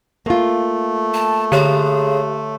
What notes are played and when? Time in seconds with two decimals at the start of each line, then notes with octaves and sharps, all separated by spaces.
0.26 A3 A#3 F4
1.14 A5
1.52 D3 G#4 C#5 C6